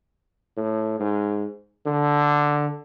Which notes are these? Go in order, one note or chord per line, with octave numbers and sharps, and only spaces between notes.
A2
G#2
D3